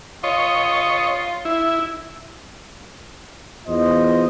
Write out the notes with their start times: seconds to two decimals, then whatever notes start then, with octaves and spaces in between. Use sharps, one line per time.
0.24 F4 C#5 D#5
1.45 E4
3.66 E2 F4 C5 D#5